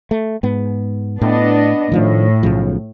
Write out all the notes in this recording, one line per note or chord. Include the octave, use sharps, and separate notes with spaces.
A3
G#2 B3
A2 B3 D4 D#5
A2 D#3 F3 D4
B1 C#3 F3